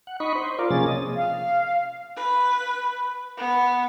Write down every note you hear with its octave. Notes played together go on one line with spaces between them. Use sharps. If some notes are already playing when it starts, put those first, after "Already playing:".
F#5
D#4 D#5 B5 C#6
C5
F4 A#4 D5
C3 F3 A#3 C#4 G#4 A6
D#5
F5
B4
B3